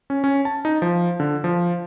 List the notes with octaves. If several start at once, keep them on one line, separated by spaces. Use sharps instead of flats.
C#4
C#4
A5
D#4
F3
D3
F3